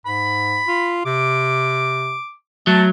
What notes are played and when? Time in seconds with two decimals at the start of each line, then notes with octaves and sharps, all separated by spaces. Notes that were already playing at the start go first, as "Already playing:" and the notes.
0.06 G#2 B5
0.67 F4
1.06 C3 D6
2.67 F#3 A3 A5